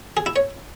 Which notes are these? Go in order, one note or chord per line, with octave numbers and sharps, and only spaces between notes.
G#4
E4
C#5